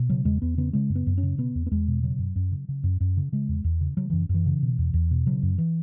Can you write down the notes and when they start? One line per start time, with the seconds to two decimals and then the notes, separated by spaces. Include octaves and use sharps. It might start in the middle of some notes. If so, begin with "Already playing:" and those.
Already playing: B2
0.10 C#3 F#3
0.25 E2 G#3
0.42 E2 B3
0.57 C#3 B3
0.73 C#3 G#3
0.89 F#2
0.95 B3
1.07 F#2
1.18 C#4
1.23 C#3
1.38 B2 B3
1.55 E2
1.66 B3
1.71 E2 G#3
1.88 B2
2.03 C#3 F#3
2.19 F#2
2.36 F#2
2.51 C#3
2.68 C#3
2.83 F#2
3.00 F#2
3.17 C#3
3.32 C#3 G#3
3.49 E2
3.64 E2
3.81 C#3
3.97 C#3 F#3
4.10 F#2 E3
4.29 F#2
4.34 E3
4.46 C#3
4.62 B2
4.78 E2
4.94 E2
5.11 B2
5.26 C#3 F#3
5.43 F#2
5.58 E3